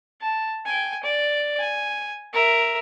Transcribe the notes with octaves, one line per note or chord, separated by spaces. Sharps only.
A5
G5 G#5
D5
G#5
A#4 E5